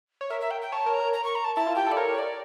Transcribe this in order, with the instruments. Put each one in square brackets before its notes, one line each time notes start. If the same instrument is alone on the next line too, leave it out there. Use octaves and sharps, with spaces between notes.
[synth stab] C#5
[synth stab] A#4 [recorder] E5
[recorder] E5
G5
G5
[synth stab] C#5 [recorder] A5
[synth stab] A#4
[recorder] A#5
[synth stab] A#4
[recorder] A#5
C#6
A#5
A5
[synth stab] E4 [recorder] A5
[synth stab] F4
[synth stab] G4 [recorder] G5
[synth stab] A4 [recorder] D5
[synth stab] A#4 [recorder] C#5
[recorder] D5